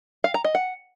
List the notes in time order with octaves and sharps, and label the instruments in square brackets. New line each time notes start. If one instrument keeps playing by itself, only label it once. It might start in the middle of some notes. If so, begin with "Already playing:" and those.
[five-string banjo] F5
A#5
D#5
F#5